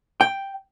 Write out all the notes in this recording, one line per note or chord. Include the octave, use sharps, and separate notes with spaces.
G5